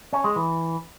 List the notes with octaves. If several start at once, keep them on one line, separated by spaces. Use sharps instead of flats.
C#4
G#3
E3